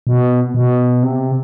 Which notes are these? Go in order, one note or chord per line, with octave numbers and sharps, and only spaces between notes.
B2
B2
C3